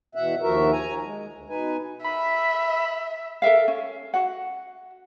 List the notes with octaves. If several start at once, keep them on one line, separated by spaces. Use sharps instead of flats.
E2 B2 E5 F#5
D#2 F3 F#4 A#4 E5
G#5 A#5
G#3
D2
B2 D#4 B4 G#5
E5 B5
A4 A#4 E5 F5
C#4
F#4 F#5